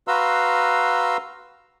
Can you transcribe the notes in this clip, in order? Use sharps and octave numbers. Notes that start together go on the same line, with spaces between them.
F#4 B4 F5 A#5 C6 E6